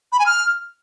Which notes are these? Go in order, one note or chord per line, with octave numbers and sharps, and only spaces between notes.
B5
G#5
F6